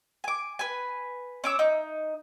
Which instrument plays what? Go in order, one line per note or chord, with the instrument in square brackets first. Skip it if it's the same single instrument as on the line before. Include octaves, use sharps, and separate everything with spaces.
[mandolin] G#5 D6
B4 G#5
C#4 D6 E6
D#4